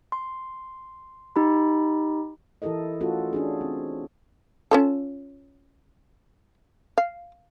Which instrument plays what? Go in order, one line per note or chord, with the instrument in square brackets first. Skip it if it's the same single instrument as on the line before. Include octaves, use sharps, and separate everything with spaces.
[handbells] C6
D#4 G4 B5
[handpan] E3 E4 G4 A4 A#4 D#5
A3 C#4 F4 F#4 A4
C#4 D4 G#4
C4
[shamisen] C#4 F4 A4
F5